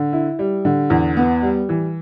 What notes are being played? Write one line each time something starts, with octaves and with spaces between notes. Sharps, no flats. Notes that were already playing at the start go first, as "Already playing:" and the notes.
Already playing: D3
E4
G3
D3
E2
B3
G3
E3